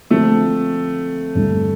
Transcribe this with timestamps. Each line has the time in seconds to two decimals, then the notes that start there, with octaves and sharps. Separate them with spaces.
0.10 D3 F3 A3 C4 F4 A4
1.35 G2 D3 A3